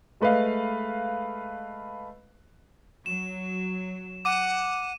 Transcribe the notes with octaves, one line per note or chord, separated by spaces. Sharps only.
G#3 A3 B4 D#5 F5
F#3 E7
F#5 D6 D#7